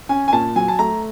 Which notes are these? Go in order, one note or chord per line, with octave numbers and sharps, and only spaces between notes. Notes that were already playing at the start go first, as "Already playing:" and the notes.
C#4 G#5
G#5
A#2 A5
F#3 G#5
A5
A3 A#5